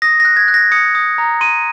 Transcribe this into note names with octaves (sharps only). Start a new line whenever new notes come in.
D#6 A#6
F#6 A#6
G#6
F#6
A#6
D#6 C#7
D#6
A#5
C6 D#7